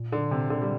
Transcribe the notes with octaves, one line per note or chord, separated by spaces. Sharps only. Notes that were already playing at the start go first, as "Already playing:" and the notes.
Already playing: A#2
D3
C3
D3
G3